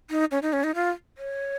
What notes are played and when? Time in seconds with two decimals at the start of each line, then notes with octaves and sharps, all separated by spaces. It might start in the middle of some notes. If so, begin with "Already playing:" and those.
0.10 D#4
0.31 C#4
0.42 D#4
0.53 C#4
0.64 D#4
0.75 F4
1.18 C#5